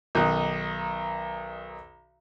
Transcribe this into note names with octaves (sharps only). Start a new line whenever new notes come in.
B1 D#3 D#4 F#6